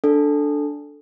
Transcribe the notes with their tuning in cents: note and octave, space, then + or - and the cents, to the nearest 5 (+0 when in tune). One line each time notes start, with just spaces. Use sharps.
D4 +0 A4 +0